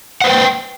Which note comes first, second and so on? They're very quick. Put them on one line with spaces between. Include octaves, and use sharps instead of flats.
F#5 C5 B4 G5